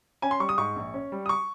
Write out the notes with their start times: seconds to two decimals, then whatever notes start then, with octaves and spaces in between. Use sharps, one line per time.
0.22 C#4 G#5
0.31 C6
0.40 G3 C#6
0.49 D#6
0.58 G#2 C#6
0.76 A#1
0.94 C#4
1.12 G3
1.26 D#6
1.29 C#6